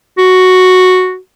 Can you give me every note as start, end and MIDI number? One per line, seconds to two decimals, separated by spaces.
0.18 1.17 66